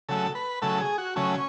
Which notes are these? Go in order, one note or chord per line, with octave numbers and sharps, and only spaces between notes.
C#3 F#3 A3 A4
B4
C#3 F#3 A3 A4
G#4
F#4
C#3 F#3 A3 C#4